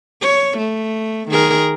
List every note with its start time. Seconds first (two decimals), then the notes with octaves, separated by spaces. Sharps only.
0.21 C#5
0.58 A3
1.29 D#3 G#4 A#4